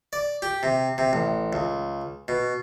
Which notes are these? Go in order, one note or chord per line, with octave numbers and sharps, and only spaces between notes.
D5
G4
C3
C3
A1
C#2
B2